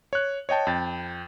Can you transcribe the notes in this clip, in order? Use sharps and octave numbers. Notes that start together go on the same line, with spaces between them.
C#5 F#6
C#5 D#5 G5 A5
F2 G5 A6